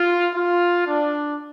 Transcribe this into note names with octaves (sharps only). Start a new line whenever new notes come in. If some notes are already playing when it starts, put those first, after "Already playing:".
Already playing: F4
F4
D4